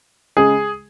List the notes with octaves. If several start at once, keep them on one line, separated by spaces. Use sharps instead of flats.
C#3 G#3 G#4